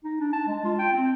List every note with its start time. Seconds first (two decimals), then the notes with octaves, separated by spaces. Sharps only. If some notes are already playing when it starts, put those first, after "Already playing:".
0.04 D#4
0.20 D4
0.33 A5
0.47 G#3
0.65 F4
0.79 G5
0.92 C4